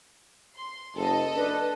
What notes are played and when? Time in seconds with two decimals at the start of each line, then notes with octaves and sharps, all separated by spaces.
0.55 C6
0.95 F#1 A4 D#5
1.36 D4 B4